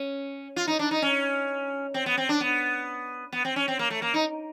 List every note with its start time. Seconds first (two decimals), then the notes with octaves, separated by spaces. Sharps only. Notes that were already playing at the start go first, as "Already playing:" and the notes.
Already playing: C#4
0.56 F4
0.67 D#4
0.79 D4
0.91 D#4
1.02 C#4
1.94 C4
2.06 B3
2.17 C4
2.29 D4
2.40 B3
3.32 B3
3.45 C4
3.56 C#4
3.68 C4
3.79 A#3
3.90 A3
4.02 A#3
4.14 D#4